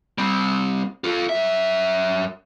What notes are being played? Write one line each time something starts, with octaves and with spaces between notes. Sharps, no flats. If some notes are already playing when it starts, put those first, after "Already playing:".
G3 C4
F4 A4
F#2 E5